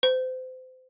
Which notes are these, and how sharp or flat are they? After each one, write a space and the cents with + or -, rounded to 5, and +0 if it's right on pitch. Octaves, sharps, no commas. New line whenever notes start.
C5 -30